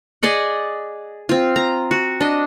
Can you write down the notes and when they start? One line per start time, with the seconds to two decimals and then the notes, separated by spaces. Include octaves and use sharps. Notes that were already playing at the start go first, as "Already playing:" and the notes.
0.23 G#4 D5 D#5 F#5
1.29 C4 F4
1.56 A#5
1.91 F#4
2.21 D4 D#5